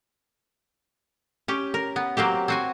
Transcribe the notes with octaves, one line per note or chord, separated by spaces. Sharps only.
C#4 G4
A#4
B3
F#3 A#3 C4 G4
C4 F#4 G#5